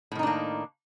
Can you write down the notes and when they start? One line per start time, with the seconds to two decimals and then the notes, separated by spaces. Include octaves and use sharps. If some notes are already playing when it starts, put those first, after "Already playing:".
0.12 A2
0.15 D#3
0.19 D#4
0.23 D4
0.27 A#3